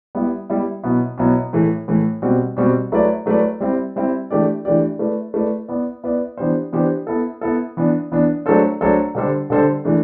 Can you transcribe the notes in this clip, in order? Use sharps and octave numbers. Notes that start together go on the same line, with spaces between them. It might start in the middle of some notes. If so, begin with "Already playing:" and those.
G3 B3 E4
G3 B3 E4
B2 F#3 B3 E4
B2 F#3 B3 E4
A2 E3 A3
A2 E3 A3
B2 G3 C4 F#4
B2 G3 C4 F#4
F#3 A3 E4 B4 D5
F#3 A3 E4 B4 D5
G3 C4 E4
G3 C4 E4
E3 A3 D4 G4 D5
E3 A3 D4 G4 D5
A3 E4 B4 D5
A3 E4 B4 D5
B3 E4 B4 D5
B3 E4 B4 D5
E3 B3 D4 G4 C5
E3 B3 D4 G4 C5
B3 E4 A4
B3 E4 A4
E3 B3 D4
E3 B3 D4
F#3 A3 D4 A4 C5
F#3 A3 D4 A4 C5
D3 G3 D4 A4 C5
D3 G3 D4 A4 C5
E3 A3 D4